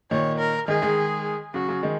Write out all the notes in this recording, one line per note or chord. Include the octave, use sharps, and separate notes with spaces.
A#2 D#3 C#5
A#4
D#3 G#3 G#4
D#3 G#3
C#3 F#3 F#4
C#3 F#3
D#3 G#3